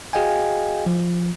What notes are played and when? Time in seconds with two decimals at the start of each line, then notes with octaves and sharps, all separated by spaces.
0.13 F#4 G#4 D#5 F5 G5 G#5
0.86 F3